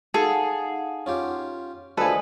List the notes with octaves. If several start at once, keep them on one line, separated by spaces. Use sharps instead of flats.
D#4 G#4 A4 F5 F#5
C#4 F4 G4
D2 F3 G#4 A4 B4 D#5 G#5 D#6